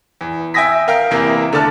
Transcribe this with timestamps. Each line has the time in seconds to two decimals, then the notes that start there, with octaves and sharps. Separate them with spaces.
0.21 E2
0.54 E5 G5 G#5 D#6 A#6 B6
0.88 A#4 F5 G5 F6
1.11 E2 C3 A#3
1.53 D3 A3 D5 A5 F6